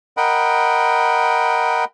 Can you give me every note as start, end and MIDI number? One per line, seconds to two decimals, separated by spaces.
0.17 1.84 70
0.17 1.84 75
0.17 1.84 78
0.17 1.84 79
0.17 1.84 83